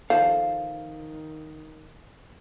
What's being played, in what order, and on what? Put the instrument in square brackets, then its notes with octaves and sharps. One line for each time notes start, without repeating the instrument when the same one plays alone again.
[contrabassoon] D#3 [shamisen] F3 [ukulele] A4 [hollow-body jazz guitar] F5